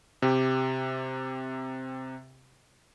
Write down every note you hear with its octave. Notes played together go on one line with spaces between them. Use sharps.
C3 G4